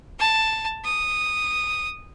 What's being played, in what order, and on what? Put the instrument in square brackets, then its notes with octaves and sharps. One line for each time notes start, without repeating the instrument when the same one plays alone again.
[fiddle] A5
D#6